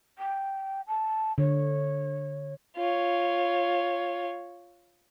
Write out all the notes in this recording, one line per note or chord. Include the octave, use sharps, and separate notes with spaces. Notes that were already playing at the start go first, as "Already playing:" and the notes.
G5
A5
D3 C#5
F4 C#5